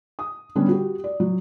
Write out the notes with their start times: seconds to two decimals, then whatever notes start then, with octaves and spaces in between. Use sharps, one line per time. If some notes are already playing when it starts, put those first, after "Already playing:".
0.19 D#6
0.55 D3 G3 B3 C#4
0.68 F#4 G4
1.04 D5
1.20 F#3